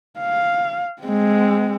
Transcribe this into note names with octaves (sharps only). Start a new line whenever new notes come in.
F5
G#3 C4